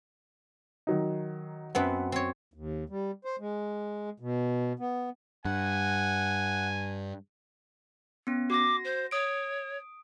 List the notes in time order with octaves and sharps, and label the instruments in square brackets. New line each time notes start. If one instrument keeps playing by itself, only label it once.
[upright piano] D#3 F#3 D#4
[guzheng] F#2 B3 C4 [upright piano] B4 F#5
[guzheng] C4 C#5
[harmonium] D#2
G3
C5
G#3
B2
B3
[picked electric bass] G2 [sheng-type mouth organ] F#5 [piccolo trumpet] G#5
[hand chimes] B3 C#4
[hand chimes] F#4 A#6 [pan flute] D6
[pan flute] C5
[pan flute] C#5 [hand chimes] D#6 D7